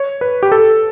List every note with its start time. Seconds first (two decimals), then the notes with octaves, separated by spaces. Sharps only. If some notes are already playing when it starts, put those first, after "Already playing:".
Already playing: C#5
0.21 B4
0.43 G4
0.52 A4